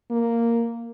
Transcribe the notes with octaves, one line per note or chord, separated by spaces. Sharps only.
A#3